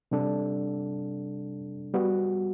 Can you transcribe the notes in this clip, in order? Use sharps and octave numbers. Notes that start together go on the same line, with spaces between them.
C3 G3 D4 A4
G3 B3 F#4